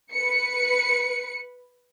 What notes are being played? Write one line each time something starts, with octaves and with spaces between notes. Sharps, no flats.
B4 C#7